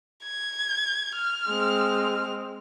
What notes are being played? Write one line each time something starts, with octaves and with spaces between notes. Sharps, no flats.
G#6
F6
G#3 C4